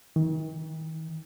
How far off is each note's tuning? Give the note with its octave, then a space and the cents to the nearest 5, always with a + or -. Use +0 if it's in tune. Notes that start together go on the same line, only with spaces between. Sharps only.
D#3 +40